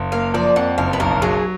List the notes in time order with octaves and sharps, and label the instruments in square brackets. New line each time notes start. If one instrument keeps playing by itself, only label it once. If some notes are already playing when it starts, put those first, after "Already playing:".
Already playing: [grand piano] F#1
[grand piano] A#3 [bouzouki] F5
[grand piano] F3 [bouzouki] D5
[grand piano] F2 [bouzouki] F#5
[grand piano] F#1 [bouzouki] F5
[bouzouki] B4
[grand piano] B1 [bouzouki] A#4
[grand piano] F#3 [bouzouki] G#4